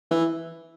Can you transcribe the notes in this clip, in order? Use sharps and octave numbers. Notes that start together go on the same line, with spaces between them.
E3